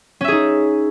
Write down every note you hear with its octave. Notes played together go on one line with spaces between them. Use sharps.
C#4 D#4 G#4 E5